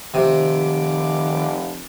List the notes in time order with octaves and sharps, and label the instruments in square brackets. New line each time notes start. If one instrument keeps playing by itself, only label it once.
[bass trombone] F1 [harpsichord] C3 [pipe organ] D#3 D6